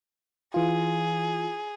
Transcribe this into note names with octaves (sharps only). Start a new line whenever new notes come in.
E3 F4 G#4